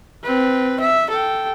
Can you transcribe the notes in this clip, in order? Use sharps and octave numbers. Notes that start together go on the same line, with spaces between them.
C4 B4
E5
A4 G5